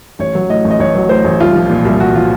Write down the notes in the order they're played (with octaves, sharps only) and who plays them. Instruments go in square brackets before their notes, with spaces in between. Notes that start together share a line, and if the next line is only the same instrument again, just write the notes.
[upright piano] A1 C#5
F#3
A2 D#5
A1
D#5
A1 C#5
F#3
A2 C5
A1
C2 F4
F3
A#2
C2
C2 F#4
F3 F4